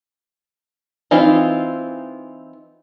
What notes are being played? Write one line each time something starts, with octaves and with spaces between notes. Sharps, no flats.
E3 C4 D#4 F4